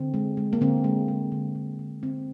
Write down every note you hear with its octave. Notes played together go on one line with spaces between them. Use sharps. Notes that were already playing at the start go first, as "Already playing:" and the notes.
Already playing: D3 C4
G#3
G#3
A#3
D3 C4
G#3
G#3
D3
D3
D3
D3 C4